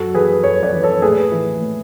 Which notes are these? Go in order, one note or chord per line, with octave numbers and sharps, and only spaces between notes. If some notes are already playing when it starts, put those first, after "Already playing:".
Already playing: F#2 F#4 A4
E3 G#4 B4
F#2 A4 C#5
B4 D5
E3
A4 C#5
A2 G#4 B4
E3
A2